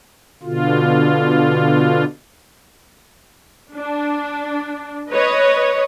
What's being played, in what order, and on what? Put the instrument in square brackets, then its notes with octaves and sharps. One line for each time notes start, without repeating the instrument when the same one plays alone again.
[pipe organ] B2 D3 F4
[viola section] D4
B4 C#5 D#5